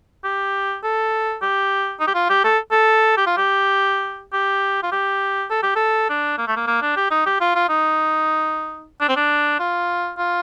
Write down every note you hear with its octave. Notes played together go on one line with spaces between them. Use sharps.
G4
A4
G4
D#4
G4
F4
G4
A4
A4
G4
F4
G4
G4
F4
G4
A4
G4
A4
D4
A#3
A3
A#3
A#3
D4
G4
D#4
G4
F4
F4
D#4
D4
C4
D4
F4
F4